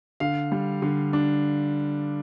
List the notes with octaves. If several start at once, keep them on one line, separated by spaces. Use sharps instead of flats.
D3 F5
G3
D3
D4